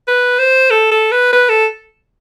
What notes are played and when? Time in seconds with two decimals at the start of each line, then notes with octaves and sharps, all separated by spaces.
0.07 B4
0.39 C5
0.71 A4
0.92 A4
1.12 B4
1.33 B4
1.49 A4